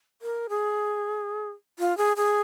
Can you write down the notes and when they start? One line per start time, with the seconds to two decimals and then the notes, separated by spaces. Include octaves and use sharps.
0.22 A#4
0.49 G#4
1.79 F4
1.98 G#4
2.17 G#4